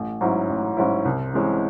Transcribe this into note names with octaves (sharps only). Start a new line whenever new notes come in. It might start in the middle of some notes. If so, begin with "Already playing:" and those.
Already playing: A1
G#2 F#3 C#4 E4
A1
G#2 F#3 C#4 E4
C2
C3 E3 G#3 C#4